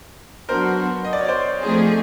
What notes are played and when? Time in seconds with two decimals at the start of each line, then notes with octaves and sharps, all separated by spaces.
0.49 F#3 B3 D4 F#4 A#4 C5
1.05 D#5
1.13 D5
1.21 C#5
1.28 C5 D5
1.61 F3 A3 C4 D#4 G#4